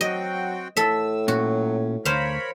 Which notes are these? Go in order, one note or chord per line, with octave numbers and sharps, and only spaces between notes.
F#3 C4 F#4 D#5 G5
A2 A4 E5 E6
A#2 F#3 C#4 F#4
D2 A#4 C5 C#5 F5 B5